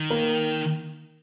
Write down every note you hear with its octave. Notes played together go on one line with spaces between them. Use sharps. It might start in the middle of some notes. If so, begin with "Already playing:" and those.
Already playing: D#3
A#3